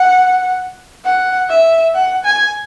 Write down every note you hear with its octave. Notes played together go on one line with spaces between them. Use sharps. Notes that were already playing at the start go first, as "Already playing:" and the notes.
Already playing: F#5
F#5
E5
F#5
G#5